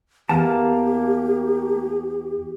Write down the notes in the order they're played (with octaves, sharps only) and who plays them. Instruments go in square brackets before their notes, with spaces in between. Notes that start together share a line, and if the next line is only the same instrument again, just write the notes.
[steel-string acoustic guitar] E2 [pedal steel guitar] A#3 F5 A5 [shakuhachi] G4